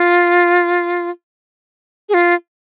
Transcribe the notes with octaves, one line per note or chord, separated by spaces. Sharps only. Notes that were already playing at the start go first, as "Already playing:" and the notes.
Already playing: F4
G#4
F4